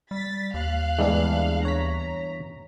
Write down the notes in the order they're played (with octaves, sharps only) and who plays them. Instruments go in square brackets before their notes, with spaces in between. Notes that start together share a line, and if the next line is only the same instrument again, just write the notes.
[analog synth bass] G3 [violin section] A6 B6
[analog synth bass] D#2 [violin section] F5 F#6
[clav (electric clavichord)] E2 G2 E3 [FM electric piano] G#3 D4 G#4
[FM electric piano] C#5 B6 [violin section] A#5